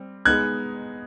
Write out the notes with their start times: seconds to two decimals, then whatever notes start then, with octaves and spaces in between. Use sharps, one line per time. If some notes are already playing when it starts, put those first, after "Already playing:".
Already playing: G3 C4
0.25 G#3 B3 D#4 G#4 F#6 G#6